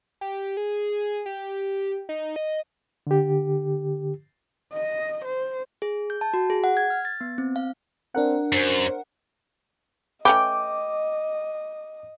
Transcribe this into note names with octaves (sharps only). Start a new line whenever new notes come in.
G4
G#4
G4
D#4
D#5
D3 G4
D#5
C5
G#4
G6
A5
F#4
G#4
F#5
G#6
F6
A6
B3
C4
F5
C4 D4 A#4 F#5
F#2 C5
A3 C#4 B4 D#5 G5 D6